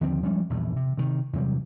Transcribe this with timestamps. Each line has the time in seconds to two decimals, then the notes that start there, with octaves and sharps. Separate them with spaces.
0.01 D#2 D3 F3 C4
0.23 F3 G3 G#3 C#4
0.50 A#1 E2 G2
0.76 C3
0.97 C3 D#3
1.33 E2 C3 F#3 G3